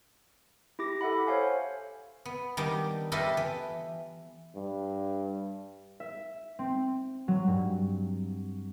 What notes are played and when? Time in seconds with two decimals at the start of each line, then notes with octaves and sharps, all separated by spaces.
0.79 E4 G4 D6 A#6
1.01 A4 E5 F#5 B5
1.27 C5 C#5 F5 G#5
2.25 B3
2.57 D#3 G3 D4 D#4
3.12 E4 F4 G4 A4 B4 D#5
3.37 E3
4.56 G2
6.00 E5
6.59 C4
7.28 F#3
7.48 G2